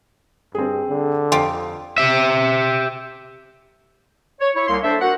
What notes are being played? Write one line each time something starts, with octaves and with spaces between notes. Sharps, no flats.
G2 C4 G#4
D3
F2 F4 G4
G4 E5
C#5
E4 C#5
C2 A#3 C6
D4 A4 C5 E5
F#4 A#4 F#5